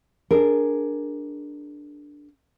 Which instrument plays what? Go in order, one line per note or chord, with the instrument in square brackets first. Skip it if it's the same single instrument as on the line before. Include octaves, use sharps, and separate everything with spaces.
[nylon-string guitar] D4 G#4 A#4